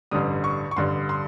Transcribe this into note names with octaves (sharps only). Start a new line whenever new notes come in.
A1 G2 D3 G3 D#6
C#6
C#6
A1 G2 D3 G3 C6
C6